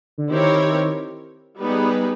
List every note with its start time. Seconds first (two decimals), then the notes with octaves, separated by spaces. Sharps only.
0.18 D3
0.29 D#3 C4 E4 G4 A#4 C#5
1.59 G3 B3 D#4 G#4 B4